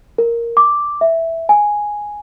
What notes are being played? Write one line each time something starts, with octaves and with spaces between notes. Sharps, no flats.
A#4
D6
E5
G#5